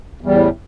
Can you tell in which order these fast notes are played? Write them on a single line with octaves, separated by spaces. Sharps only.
E2 G3 A2